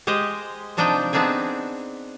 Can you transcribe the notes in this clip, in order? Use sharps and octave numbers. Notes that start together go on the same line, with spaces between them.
G#3 G4 C5 D#5
C3 F3 D4 D#4 D#5 G5
B3 C4 D4 D#4 G#4